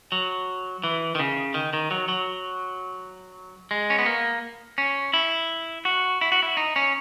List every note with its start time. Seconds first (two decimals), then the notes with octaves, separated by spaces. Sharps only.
0.12 F#3
0.84 E3
1.15 D#3
1.20 C#3
1.54 D#3
1.73 D#3
1.91 F#3
2.09 F#3
3.71 G#3
3.90 C#4
3.99 B3
4.06 A#3
4.78 C#4
5.13 E4
5.85 F#4
6.21 E4
6.32 F#4
6.43 E4
6.57 D#4
6.76 C#4